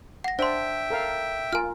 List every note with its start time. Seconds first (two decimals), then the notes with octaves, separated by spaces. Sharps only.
0.24 F#5 A#6
0.39 D4 C5 E5 G5 C6
0.90 A4 A#4 F5
1.53 F4 A#4 G#5 F6